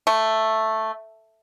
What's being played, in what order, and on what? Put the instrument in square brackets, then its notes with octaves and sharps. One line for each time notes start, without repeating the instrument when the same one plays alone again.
[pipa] A3